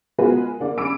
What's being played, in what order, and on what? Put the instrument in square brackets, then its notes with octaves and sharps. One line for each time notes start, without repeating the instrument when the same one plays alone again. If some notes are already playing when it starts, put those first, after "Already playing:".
[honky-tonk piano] G#3 B3 F4 F#4 A#4 B4
D3 A#3 D4
C#4 B5 D6 E6 D7